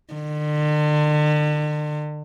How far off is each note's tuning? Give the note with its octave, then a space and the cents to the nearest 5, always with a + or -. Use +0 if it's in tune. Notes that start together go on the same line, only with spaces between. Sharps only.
D3 +40